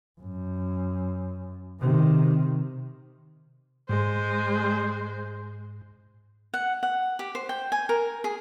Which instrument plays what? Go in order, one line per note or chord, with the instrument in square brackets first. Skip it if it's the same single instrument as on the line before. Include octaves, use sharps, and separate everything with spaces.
[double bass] F#2
C3 D#3
[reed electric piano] G#2 [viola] G#3 C5
[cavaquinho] F#5
F#5
G4
C5
G5
G#5
A#4
G#4